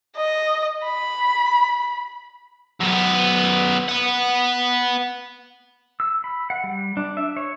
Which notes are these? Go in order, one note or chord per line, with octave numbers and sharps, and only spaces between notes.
D#5
B5
F#2 B3
B4 F#5
E6
B5
F#5
G3
D4
E5
C#5